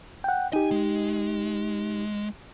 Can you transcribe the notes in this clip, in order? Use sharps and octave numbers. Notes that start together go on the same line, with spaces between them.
F#5 G5
D#4 G4 G#5
G#3